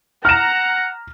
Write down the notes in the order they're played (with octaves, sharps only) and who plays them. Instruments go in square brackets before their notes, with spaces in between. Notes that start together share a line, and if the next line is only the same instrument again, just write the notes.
[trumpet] F#5 [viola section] A#5 [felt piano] F6 E7